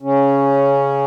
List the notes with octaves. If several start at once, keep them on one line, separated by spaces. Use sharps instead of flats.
C#3 C#4